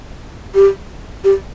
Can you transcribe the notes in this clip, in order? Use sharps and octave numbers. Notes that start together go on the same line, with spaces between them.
G4
G4